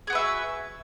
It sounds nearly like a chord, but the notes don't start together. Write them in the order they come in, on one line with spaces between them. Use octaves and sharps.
G#4 F#4 B4 E5